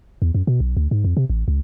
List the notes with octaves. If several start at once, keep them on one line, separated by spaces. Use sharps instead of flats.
E2
F#2
B2
B1
D2
G#2
F2
C3
A1
C#2